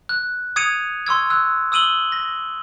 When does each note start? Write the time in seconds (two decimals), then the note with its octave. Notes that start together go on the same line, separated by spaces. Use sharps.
0.09 F#6
0.56 D#6 G#6 C#7 D#7 F7
1.07 C6 C#6 E6 G#6
1.30 E6 F#6
1.72 D#6 E6 D#7 F#7 G7
2.12 A#6